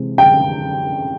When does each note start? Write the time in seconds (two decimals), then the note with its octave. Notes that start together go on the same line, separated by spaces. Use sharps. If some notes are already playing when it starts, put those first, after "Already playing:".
Already playing: C3 E3 G#3 C4
0.18 G5